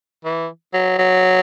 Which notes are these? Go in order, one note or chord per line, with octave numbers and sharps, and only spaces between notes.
E3
F#3
F#3